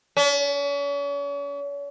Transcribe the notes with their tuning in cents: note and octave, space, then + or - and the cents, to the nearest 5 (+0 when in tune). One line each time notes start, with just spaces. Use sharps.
C#4 +40